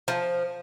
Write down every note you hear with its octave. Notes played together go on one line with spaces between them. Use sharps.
F3